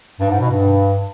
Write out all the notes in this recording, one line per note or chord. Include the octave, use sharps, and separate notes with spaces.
G2
G#2
B2
G2